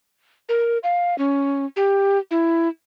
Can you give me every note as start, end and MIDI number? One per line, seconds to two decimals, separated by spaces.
0.49 0.78 70
0.84 1.17 77
1.18 1.65 61
1.76 2.18 67
2.31 2.68 64